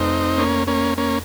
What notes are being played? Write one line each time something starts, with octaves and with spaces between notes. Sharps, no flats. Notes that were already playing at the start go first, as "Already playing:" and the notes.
Already playing: F1 C4 D#4
A#3 C#4
A#3 C#4
A#3 C#4